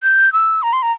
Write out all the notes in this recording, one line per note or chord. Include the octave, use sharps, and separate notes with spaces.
G6
E6
A#5
C6
A#5